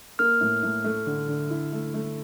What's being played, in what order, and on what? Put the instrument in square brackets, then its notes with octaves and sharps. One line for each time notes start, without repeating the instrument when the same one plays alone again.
[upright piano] A#3 [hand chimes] F6
[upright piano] A2
A2
A3
D3
D3
E4
A3
A3